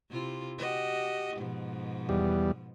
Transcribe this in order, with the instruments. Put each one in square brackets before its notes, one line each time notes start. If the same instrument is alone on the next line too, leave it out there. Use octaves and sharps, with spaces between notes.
[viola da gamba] C3 E4 F4
F#4 G4 D#5
G#2 B2 F3
[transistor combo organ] E2 G3